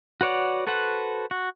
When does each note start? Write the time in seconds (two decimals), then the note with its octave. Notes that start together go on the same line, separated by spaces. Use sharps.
0.21 F#4 B4 C#5 D5 F#5
0.67 F#4 A4 B4 C5 F#5
1.31 F#4